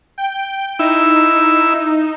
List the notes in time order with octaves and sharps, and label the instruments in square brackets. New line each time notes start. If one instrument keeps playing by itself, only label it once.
[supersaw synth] G5
[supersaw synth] D#4 [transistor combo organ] E4 E6